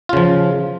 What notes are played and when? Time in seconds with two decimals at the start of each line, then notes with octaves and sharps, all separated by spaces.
0.09 F4
0.13 C#3
0.17 F3